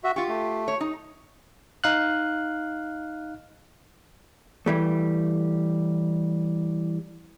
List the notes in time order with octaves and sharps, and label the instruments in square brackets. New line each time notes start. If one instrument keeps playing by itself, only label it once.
[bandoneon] F#4 E5
[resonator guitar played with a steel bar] F4 G4 [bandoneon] C#6
[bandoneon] A3
[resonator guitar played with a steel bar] C#5
D#4
[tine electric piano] D#4 F5 F#6
[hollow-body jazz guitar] E3 G3 A3